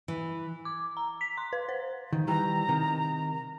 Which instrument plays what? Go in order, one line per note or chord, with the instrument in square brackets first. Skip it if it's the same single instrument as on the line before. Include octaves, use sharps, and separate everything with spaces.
[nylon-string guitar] E3
[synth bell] D6
A#5
B6
C6
B4
C5
[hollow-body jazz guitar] D#3
[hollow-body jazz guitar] D#3 E3 G3 [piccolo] A#5
[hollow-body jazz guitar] C3 D#3